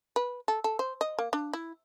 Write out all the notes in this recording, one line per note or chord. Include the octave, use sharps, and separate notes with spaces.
B4
A4
A4
C5
D#5
A#3
D4
E4